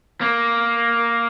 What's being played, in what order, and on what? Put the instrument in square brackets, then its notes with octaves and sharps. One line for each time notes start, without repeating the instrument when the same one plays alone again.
[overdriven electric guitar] A#3